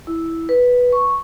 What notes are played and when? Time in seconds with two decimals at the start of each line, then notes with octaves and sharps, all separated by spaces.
0.07 E4
0.49 B4
0.92 C#6